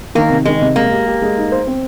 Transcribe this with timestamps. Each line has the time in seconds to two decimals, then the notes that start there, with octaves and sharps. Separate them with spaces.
0.15 D#3 A#3
0.30 C3
0.45 D#3 G#3
0.61 C3
0.76 G#3 A#3
0.91 G4
1.06 G4
1.22 G#3
1.37 D#4
1.52 C5
1.67 C4